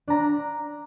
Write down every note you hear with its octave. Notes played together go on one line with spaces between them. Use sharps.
D4 A#5